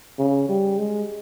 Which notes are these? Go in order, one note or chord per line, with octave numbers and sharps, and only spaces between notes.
C#3
G3
G#3